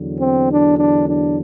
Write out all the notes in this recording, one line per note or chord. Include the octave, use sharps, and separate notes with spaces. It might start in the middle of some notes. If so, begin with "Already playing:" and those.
Already playing: E2 D3 F#3
C4
D4
D4
D4